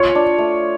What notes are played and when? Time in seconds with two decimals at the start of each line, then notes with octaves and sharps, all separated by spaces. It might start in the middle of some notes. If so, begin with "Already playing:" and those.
Already playing: F4 C#5
0.15 D4
0.38 A3